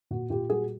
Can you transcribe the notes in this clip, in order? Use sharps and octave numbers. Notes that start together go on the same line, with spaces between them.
A#2 F#4
A#2 F4 G4
G3 F#4 G#4